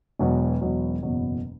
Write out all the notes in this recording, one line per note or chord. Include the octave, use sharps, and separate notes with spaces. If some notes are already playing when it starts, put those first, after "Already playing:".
E1 E2 B2 F#3
E1 E2 B2 F#3
F#1 E2 B2 F#3